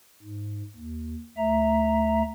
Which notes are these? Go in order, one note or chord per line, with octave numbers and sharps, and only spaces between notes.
G#2
D#2
D2 A3 E5 A#5